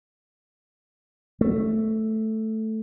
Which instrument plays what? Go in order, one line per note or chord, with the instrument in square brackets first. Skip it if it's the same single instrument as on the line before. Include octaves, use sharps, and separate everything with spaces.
[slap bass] A3